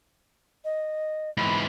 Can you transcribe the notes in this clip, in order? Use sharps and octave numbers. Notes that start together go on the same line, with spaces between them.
D#5
G#2 E3 B5